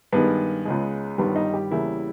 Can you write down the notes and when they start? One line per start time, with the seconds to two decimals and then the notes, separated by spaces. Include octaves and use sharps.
0.12 G2 D#3 G#3 B3
0.65 C#2 C#3 G#3
1.18 G1 G2 D#3 G3 B3
1.36 D#4
1.54 G4
1.71 E2 C#3 G3 A#3 E4